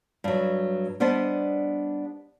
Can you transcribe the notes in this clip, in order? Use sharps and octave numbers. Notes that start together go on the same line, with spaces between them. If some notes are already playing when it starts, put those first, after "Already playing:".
G2 F#3
G3 B3 D4 C5 D5 D#5